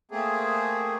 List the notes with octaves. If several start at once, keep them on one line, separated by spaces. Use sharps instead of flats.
A3 A#3 C4 G#4